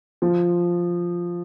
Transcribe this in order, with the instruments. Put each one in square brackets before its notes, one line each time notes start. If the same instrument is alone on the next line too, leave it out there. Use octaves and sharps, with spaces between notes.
[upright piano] F3